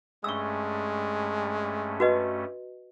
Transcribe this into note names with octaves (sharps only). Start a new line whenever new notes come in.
G2 G#3 A3 C#4 C#6 E6
F#4 B4 D#5